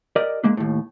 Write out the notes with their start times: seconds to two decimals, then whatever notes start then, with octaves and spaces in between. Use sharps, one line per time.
0.16 G4 A#4 D5 D#5
0.44 G#3 A#3 D4
0.57 D#2 A2